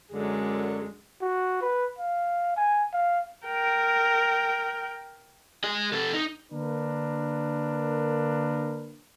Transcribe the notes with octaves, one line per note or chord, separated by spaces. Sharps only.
F#2 D3 G#3
F#4
B4
F5
G#5
F5
A#4 G5
G#4 D#5
C3 A4
D#4
D3 A#3 D4 A#4 B4